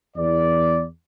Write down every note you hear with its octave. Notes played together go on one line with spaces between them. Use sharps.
E2 D5